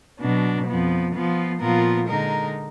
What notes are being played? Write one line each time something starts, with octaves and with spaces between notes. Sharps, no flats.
B2 F#3 D4
F2 F3 B3
F3 B3 F4
A#2 F3 B3 F4 A#4
D3 G#3 D#4 A#4